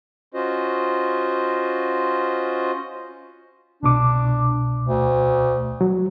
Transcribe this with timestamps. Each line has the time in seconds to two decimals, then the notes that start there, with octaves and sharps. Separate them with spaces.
0.34 C#4 F4 F#4 C5 D#5
3.83 C2 B2 D4 D6
4.86 D2
5.81 F#3